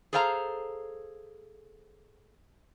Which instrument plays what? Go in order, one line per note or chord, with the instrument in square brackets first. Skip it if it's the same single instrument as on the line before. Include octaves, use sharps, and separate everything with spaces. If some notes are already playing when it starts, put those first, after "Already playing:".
[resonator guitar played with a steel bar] G#4 A4 C5 F5 A5 A#5